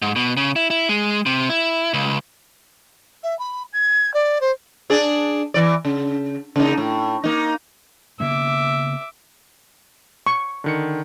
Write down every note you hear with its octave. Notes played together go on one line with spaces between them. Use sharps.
G#2
B2
C#3
E4
E4
G#3
C3
E4
C#2
E5
B5
G#6
D5
C5
D4 G#4 D5
E3 D5
C#3
C#3 A#3 D#4
A2
A#3 D#4
C#3 A#3 B3 E5 D6
C#6
D3 D#3 C#7